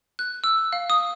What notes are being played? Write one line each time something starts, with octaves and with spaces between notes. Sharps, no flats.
F#6
E6
F5
D#6